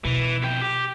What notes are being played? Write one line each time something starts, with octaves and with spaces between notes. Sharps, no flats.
B2 E3
F2 G5
G4